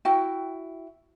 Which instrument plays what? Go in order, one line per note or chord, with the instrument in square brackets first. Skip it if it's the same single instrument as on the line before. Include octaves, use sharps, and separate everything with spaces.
[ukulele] E4 F#4 G5